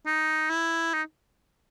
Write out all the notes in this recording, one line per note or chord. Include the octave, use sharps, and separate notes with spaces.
D#4
E4
D#4